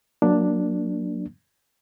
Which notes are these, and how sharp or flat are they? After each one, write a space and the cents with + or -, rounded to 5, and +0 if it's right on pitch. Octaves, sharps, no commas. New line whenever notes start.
F#3 -20 A#3 +0 D4 +0